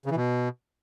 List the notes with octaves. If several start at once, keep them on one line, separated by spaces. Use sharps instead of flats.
C#3
E3
B2